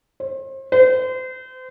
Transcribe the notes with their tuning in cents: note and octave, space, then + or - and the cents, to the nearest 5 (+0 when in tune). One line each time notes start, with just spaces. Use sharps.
C5 +40
C5 -35